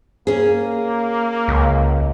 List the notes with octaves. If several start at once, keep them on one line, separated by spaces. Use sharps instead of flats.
A#3 C#4 G#4
C#2